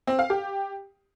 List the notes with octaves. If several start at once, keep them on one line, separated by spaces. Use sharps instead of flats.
C4
F5
G4